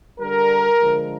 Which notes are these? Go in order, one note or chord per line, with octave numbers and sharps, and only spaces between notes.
D3 G3 A#4
D3 F3 G#3